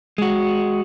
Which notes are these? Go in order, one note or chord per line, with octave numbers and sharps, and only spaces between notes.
G#3 F#4